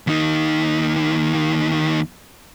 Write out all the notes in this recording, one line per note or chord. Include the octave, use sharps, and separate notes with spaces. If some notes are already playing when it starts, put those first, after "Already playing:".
D#2 D#4